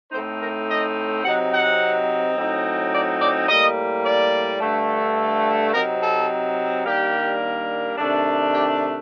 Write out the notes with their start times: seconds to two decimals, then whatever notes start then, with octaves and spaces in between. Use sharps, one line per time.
0.12 A2 A3 C4 D#4 C5
0.40 A#4
0.68 D#5
1.24 C3 F#3 C4 D#4 F#5
1.52 F#5
2.37 A2 F#3 C4 D#4
2.93 D5
3.21 D5
3.49 A2 G3 A#3 D#5
4.05 D5
4.61 G2 D3 A3
5.73 C3 F#3 C4 D#4 A#4
6.02 A4
6.86 D#3 G3 A#3 D4 G4
7.98 C3 D#3 A3 D4
8.54 G4